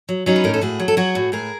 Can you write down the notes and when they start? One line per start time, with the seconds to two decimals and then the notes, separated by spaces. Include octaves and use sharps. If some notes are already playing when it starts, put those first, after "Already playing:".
0.09 F#3
0.26 F#3 C#4 D#4
0.36 B4
0.44 A2 A#4
0.54 A4
0.61 A2 F#4 G#4
0.80 F#3
0.88 A4
0.97 F#3 F#4 G#4
1.15 A2
1.32 A2 G#4 A#4